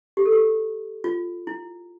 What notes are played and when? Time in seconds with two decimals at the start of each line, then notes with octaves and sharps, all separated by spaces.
0.17 G4
0.25 A4
0.33 G4
1.04 F4
1.47 E4